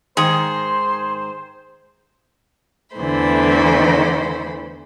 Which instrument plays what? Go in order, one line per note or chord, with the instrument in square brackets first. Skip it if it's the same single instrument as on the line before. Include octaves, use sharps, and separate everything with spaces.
[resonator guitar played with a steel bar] G#2 D#3 [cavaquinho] G#4 [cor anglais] C5 [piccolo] C6
[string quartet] E2 D3 E3 A3 C5 B5